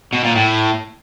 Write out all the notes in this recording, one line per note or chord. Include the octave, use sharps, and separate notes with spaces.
B2
A#2
A2